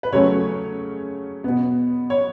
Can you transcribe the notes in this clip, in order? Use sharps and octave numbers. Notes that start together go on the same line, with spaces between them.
B4
C#3 F#3 A3 C#4 C#5
B2 B3
C#5